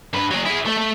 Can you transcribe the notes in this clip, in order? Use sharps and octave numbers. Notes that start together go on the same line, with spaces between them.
G2 B4
F#3 G#4
E4 G#4
A3
A3